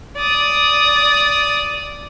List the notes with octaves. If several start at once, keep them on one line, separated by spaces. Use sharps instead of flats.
D5 D#6